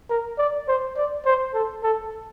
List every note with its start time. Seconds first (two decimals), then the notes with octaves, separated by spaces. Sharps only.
0.10 A#4
0.38 D5
0.68 C5
0.97 D5
1.25 C5
1.54 A4
1.84 A4